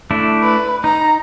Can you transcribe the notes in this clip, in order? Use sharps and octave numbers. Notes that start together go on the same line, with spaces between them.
A3 D4 E4
B4
D#4 A#5